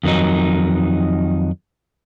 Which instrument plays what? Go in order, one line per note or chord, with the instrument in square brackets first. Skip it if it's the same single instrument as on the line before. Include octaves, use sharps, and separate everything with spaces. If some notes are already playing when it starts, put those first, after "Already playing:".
[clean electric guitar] F2 D#3 F#3 D#4